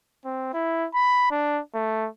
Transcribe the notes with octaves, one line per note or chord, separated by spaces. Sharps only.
C4
E4
B5
D4
A3